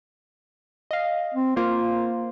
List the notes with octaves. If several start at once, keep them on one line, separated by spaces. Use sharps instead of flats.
D#5 F5
C4
A#3 F4 C5